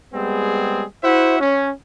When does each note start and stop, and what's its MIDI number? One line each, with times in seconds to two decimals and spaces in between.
0.14 0.84 55
0.14 0.84 56
0.14 0.84 59
0.14 0.84 60
0.14 0.84 68
1.04 1.40 64
1.04 1.40 66
1.04 1.40 72
1.04 1.40 76
1.04 1.40 78
1.40 1.70 61